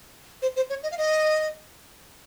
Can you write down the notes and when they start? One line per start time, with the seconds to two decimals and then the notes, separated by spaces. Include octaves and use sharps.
0.42 C5
0.56 C5
0.70 C#5
0.83 D#5
0.92 F5
0.98 D#5